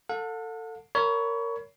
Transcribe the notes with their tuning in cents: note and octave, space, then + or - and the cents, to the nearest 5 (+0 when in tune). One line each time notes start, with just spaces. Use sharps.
A4 +25 F#5 -40
A#4 -10 C#5 +25 B5 +0